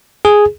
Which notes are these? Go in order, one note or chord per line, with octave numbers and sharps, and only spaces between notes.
G#4